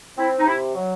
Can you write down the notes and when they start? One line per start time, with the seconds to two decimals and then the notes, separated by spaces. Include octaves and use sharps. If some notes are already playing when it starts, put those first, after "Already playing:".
0.18 C4 E4
0.39 D#4
0.45 C3 E4
0.75 F#3